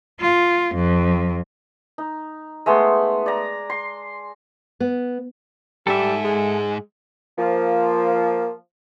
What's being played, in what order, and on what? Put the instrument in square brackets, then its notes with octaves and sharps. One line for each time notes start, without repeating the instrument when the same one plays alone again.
[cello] F4
F2
[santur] D#4
G#3 A3 B3 C6
D5 A#5
C6
[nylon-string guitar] B3
[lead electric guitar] G#2 [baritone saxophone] G3 [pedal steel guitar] A4 E5
[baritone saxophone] G#3
[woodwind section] F3 [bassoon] A#3